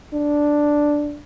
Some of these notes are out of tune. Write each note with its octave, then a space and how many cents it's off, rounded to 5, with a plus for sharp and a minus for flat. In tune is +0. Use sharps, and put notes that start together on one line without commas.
D4 +0